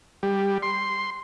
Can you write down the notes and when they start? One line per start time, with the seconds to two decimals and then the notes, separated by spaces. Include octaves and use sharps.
0.23 G3
0.62 C6